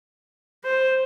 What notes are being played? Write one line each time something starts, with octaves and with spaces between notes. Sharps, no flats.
C5